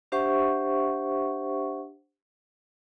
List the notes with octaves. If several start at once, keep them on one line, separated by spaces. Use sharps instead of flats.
D4 G4 C5 E5 F#5 C#6